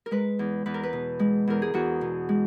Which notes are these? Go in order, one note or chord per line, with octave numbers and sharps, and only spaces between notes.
A#4
G#3 B4
E2
E2 B4
A#4
B4
B2
G#3
E2 A#4
G#4
E2 F#4
B2
G#3